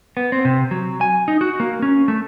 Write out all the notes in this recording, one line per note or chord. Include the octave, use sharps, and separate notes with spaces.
B3
C4
C3
F#3
G#5
D#4
F#4
A#3
C#4
A3